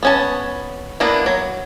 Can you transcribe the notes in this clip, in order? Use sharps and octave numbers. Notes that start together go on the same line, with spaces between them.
B3 C#4 A5
A#3 B3 D4 E4
F#3